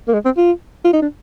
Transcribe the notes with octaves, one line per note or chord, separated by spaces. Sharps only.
A#3
G#3
C4
F4
F4
D#4
D4